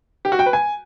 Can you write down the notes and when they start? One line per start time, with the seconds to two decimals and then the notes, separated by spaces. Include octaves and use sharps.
0.25 G4
0.32 F#4
0.39 G5
0.46 B4
0.53 G#5